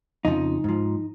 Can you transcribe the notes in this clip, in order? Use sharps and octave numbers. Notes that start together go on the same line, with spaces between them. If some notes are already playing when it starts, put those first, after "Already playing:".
F2 C#3 F3 D#4
G#2 F3